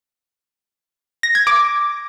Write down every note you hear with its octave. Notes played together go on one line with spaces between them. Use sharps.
A#6
G#6
D6